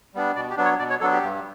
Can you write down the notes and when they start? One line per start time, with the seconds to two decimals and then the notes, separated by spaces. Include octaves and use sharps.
0.14 G3 B3 D4
0.36 B2 D5
0.50 G4
0.57 F#3 B3 D4
0.65 C#5
0.79 B2 D5
0.90 C#5
1.01 F#3 B3 D4 A4
1.12 G4
1.22 G2